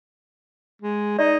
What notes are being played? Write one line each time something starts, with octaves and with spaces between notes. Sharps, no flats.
G#3
D#4 D5